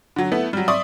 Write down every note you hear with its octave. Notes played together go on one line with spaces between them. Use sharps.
D3 F#3
A3 B3 E4
F#3 G3
D5 E5 C6 C#6 D#6